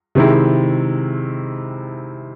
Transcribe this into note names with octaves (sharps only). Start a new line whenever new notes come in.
C3 D#3 G#3 C4 E4